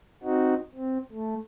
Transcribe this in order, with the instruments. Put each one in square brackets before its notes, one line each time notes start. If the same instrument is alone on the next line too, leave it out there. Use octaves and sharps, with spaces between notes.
[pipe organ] C4 D#4 F#4
C4
A3